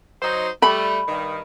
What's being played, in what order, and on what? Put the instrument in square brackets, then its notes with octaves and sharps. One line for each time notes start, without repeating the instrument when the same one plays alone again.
[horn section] F#3 D#4 C5
[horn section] G3 A3 [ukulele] B5
[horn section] G2 D#3